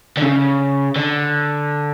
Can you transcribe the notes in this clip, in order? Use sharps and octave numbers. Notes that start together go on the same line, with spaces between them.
D3
C#3
D3